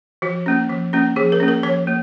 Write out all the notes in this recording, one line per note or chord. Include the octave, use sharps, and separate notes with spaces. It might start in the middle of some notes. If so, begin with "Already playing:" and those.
F3 F#4
A#3 C#4
F3
A#3 C#4
F3 G#4
A#4
A#3 C#4
A#4
F3 C#5
A#3